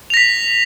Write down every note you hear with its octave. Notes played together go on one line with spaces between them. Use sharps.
A#6 B6 F7